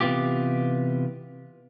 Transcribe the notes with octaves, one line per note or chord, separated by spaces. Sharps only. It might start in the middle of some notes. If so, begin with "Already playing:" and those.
C3 E3 B3 F4 G4